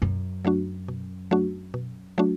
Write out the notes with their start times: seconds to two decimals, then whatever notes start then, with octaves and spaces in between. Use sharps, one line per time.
0.02 F#2 B2
0.45 F#3 A3 D4 F#4
0.88 B2
1.31 F#3 A3 D4 F#4
1.74 B2
2.18 F#3 A3 D4 F#4